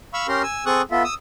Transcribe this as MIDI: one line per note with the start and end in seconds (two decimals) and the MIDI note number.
0.14 0.27 77
0.14 0.27 83
0.14 0.27 85
0.14 0.27 88
0.28 0.42 61
0.28 0.42 67
0.28 0.42 70
0.28 0.42 82
0.28 0.42 84
0.43 0.64 80
0.43 0.64 88
0.66 0.82 60
0.66 0.82 68
0.66 0.82 69
0.66 0.82 85
0.66 0.82 87
0.66 0.82 90
0.91 1.03 59
0.91 1.03 65
0.91 1.03 69
0.91 1.03 76
1.04 1.14 87
1.04 1.14 88